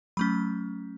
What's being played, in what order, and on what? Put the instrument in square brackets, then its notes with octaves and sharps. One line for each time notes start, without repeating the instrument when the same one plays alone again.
[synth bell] F#3 A3 C#4 B5